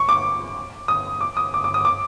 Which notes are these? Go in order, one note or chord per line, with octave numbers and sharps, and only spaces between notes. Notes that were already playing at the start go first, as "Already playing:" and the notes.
Already playing: C#6
D6
D#6
D6
D#6
D6
D6
D#6
D6